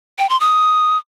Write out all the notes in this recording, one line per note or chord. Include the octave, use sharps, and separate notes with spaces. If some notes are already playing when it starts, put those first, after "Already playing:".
G5
C6
D#6